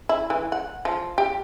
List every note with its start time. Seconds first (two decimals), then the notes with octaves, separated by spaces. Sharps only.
0.09 E4
0.30 E3
0.52 F#5
0.85 F3
1.18 G4